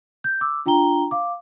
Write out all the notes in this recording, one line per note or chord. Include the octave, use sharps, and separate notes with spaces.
G6
D6 E6
D4 F4 G5 A#5 G7
F5 D6